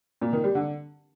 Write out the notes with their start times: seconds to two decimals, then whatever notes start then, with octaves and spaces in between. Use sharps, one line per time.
0.22 A#2
0.33 D#3
0.44 G3
0.55 D3